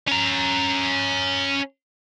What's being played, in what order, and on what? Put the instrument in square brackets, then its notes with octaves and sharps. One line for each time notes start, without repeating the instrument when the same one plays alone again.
[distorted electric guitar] C#4 A#5